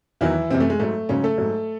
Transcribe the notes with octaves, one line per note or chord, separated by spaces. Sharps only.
E2 D#3 E3 F#3 E4
F#2 C3 E3 C4
A3
G#3
G#2 F#3 A3
G#2 C#3 F#3 C#4
A3 A4
G#2 F#3